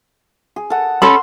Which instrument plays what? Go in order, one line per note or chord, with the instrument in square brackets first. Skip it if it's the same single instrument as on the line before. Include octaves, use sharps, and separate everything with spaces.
[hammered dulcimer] G#4
A4 F#5
[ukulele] C#4 A4 B5 [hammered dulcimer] C6